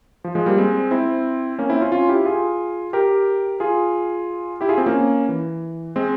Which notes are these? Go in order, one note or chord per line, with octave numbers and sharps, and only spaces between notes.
F3
F3 G#3
G3 A#3
G#3 C4
C4 E4
A#3 C#4
C4 E4
C#4 F4
C#4 F4
E4 G4
F4 G#4
G4 A#4
F4 G#4
E4 G4
F4 G#4
C4 E4
A#3 C#4
E3
G#3 C4